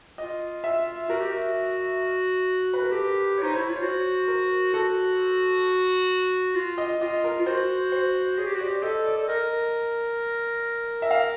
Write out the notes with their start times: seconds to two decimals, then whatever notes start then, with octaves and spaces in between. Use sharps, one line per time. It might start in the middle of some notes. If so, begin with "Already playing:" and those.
0.18 F4 D#5
0.64 E5
1.10 F#4 A#4
1.21 G4
1.33 F#4
2.74 B4
2.82 A#4
2.92 G4 A4
3.37 C#5
3.43 D#4 C5
3.52 E4 C#5
3.70 F4
3.76 C#5
3.83 F#4 C5
4.28 A#4
4.74 F#4 A4
6.55 F4
6.78 D#5
7.01 F4 D#5
7.24 A#4
7.40 F4
7.46 F#4 C5
7.92 C5
8.38 G#4 C#5
8.47 G4
8.55 F#4
8.61 D5
8.64 G4
8.83 A4 D#5
9.06 D5
9.17 A4
9.28 A#4 D#5
11.02 E5
11.11 F5